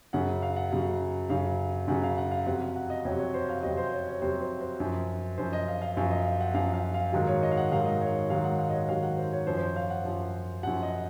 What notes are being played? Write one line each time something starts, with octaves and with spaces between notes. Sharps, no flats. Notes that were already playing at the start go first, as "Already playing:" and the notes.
F#2 C#3 F#3 F#5
F5
F#5
F#2 C#3 F#3
F#2 C#3 F#3 F5
F#2 C#3 F#3 F#5
F5
F#5
F5
F2 C3 F#3 F#5
F5
F#5
D#5
F2 C3 F#3 C#5
C#5
C5
F5
F2 C3 F#3 D#5
C5
C#5
C#5
F2 C3 F#3 C5
C5
C5
F#2 F3
F#2 F3 C5
D#5
F5
F5
F#2 F3 F5
D#5
F5
F#5
F#2 F3 F5
F5
F5
G#2 D#3 F#3 F5
C#5
D#5
F5
F#5
G#2 D#3 F#3 F5
D#5
C#5
G#2 D#3 F#3 F5
F#5
F5
D#5
C#5
G#2 D#3 F#3 F5
F#5
C5
C#5
F#2 F3 C5
C5
C#5
F5
F#5
F#2 F3
F#2 F3 F#5
D#5